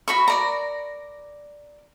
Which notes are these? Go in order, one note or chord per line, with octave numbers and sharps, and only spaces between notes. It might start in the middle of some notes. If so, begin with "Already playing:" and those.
F#4 B5 C#6
A#4 D5 A#5